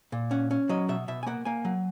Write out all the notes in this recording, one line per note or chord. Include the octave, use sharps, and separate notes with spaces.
A#2
C#4 F#5
C#4
F#3 D#5
B2 E5
B2 E5
G#5
A#3 F#5
A#3 G#5
F#3